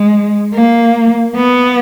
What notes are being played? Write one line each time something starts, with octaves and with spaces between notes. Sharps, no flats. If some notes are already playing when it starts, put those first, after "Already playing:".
Already playing: G#3
A#3
B3